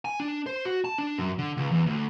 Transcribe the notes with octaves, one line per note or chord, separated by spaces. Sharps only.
G#5
D4
C5
F#4
A5
D4
F#2
D3
C#2
E2
D2